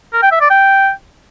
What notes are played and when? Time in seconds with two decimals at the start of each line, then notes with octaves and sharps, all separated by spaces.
0.13 A#4
0.22 G5
0.32 E5
0.41 D5
0.50 G5